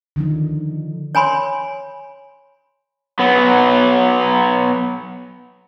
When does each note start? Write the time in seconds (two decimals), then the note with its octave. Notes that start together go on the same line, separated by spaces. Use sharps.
0.16 D3 D#3 F3 D#4
1.15 C#5 G#5 B5 C6
3.19 F#3 B3